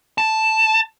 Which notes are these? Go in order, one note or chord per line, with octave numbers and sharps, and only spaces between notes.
A5